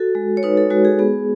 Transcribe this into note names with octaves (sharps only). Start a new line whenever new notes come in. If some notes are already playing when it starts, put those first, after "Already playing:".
Already playing: F#4 A4
G#3
C#5
D#4 B4
A4
G#3 F#4
G#4
B3 G#4